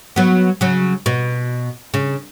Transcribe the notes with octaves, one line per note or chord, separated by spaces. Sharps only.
F#3 B3
C#3 F#3
B2
C#3